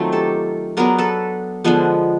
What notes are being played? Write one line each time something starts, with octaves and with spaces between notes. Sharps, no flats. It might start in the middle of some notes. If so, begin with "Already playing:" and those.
Already playing: D#3 F#3 A3 C4 F4
G4 A4
F#3 B3 D4 G#4 A#4
A4 B4
D3 F3 G#3 B3